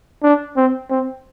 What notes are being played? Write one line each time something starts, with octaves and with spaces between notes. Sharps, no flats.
D4
C4
C4